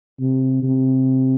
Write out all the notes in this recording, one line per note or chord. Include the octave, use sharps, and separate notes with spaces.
C3
C3